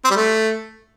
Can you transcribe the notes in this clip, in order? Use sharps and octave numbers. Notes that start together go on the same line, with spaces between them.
C4
G3
A3